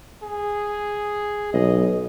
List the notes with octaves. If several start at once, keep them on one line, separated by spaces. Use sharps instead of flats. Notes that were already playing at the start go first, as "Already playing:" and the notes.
G#4
B1 D#5